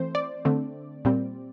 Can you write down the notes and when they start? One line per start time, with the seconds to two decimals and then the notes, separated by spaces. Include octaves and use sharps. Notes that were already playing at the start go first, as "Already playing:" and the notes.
Already playing: E3 A3 C4 C5
0.15 D5
0.45 D3 A3 C4
1.05 A#2 G3 C4